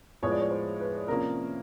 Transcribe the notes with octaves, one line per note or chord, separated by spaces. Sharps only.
A2 F3 G#3 B3 C#5
D5
C#5
C5
B4
C3 F3 A#3 C#4 A#4